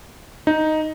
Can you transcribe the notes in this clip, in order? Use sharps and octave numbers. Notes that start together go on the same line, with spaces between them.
D#4